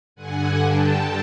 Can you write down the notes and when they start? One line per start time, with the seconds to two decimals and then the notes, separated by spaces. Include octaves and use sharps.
0.16 G2 D3 F#5 G#5
0.61 G5 A5